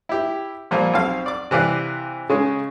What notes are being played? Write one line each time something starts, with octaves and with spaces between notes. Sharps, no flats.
E4 G4
A#2 F3 G3 A#3
B1 C4 F5
D5 D6
C3 E3 D5 F5 F#6
C#3 G#3 C#4